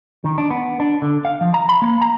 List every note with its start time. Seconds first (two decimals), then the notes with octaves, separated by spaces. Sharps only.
0.24 D#3
0.38 D4
0.51 B3
0.80 D4
1.02 D3
1.25 F5
1.41 F3
1.54 A#5
1.69 B5
1.82 A#3
2.01 A#5